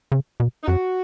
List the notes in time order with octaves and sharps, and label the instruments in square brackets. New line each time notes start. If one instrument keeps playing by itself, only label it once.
[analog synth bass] C#3
B2
[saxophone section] D#4
[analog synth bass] F#2 [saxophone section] F#4